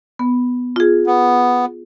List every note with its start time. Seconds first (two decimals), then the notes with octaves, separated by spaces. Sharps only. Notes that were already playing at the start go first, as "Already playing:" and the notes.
0.19 B3
0.76 F4 G#4
1.07 B3